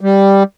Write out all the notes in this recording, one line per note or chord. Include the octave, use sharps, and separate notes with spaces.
G3